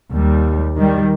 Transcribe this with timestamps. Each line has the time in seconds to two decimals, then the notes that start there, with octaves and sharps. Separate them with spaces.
0.13 D#2 G3
0.77 D#3 G3